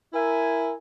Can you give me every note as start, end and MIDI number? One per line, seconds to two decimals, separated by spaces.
0.12 0.74 64
0.12 0.74 70
0.12 0.74 76
0.12 0.74 80